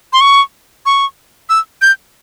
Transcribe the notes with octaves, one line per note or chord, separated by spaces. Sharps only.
C6
C#6
C#6
E6
G6